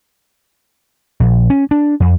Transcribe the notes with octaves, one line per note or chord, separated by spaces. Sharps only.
A#1
C#4
D4
F2